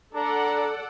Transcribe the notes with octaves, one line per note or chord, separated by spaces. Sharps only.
D4 A4 D5 F#5 A#5